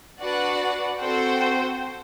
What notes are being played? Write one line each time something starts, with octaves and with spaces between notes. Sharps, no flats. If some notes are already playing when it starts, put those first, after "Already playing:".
D4 F#4 B4 D5 F#5
C4 F#4 A4 C5 G5